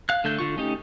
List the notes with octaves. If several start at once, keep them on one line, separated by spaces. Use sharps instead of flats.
F5 F#6
D3 A3 D4 G6
D3 F4 C#6
A3 C#4 D#4 G4